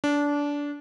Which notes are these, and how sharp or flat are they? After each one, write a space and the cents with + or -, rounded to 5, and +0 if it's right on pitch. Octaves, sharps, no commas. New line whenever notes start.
D4 -20